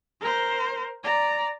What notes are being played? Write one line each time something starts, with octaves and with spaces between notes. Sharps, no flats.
A#4 C5
D5 A#5